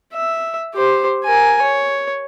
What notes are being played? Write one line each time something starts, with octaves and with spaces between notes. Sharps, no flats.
E5
G4 C5
A#4 G#5
C#5